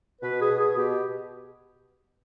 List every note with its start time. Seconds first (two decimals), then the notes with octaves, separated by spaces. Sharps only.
0.22 B2 B4
0.40 G#4
0.49 B2
0.58 G#4
0.76 B2 G4